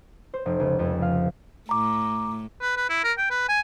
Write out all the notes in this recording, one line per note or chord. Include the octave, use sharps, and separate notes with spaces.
C5
F1
C#2
F2
F5
A2 A#5 D6
B4
B4
E4
A#4
G5
B4
G#5